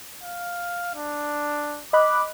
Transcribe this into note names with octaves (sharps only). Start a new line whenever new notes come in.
F5
D4
D#5 B5 D6 F#6